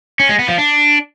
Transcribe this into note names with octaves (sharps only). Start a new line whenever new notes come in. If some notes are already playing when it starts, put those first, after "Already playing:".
C#4
G#3
B3
F3
D4